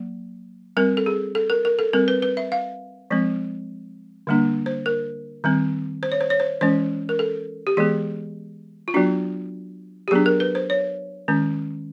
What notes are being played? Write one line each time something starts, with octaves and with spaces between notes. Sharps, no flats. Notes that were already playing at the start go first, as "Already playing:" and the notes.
Already playing: F#3 A#3
G3 C4 A#4
A4
G#4
A4
A#4
A#4
A4
G3 C4 A#4
B4
B4
E5
F5
F3 G#3 C4
D3 G3 A#3 D4
C5
A#4
D#3 G3 C4
C5
C#5
C5
C#5
C5
E3 G#3 C#4 C5
A#4
A4
G4
E3 G#3 B3 G#4
F4
F#3 B3 D4 F#4
G4
F#3 B3 D4 G#4
A#4
B4
C5
C#5
D#3 G#3 C#4